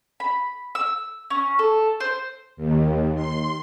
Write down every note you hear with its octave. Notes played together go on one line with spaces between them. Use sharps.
B5
E6
C#4
A4
C5
D#2
C6